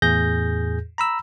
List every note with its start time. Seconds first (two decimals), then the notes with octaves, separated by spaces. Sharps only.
0.02 E2 A2 G#4 G6 A#6
0.98 A#5 B5 E6